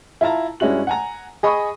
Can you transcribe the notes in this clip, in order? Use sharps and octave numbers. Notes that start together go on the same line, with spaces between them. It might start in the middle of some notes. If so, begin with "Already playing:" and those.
E4 F4 A5 A#5
G2 G#3 C#4 E4 F#4 F#7
F#5 G#5 A#5
G#4 D#5 B5 C#6 D#6